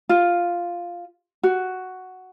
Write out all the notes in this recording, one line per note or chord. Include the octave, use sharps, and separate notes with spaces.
F4
F#4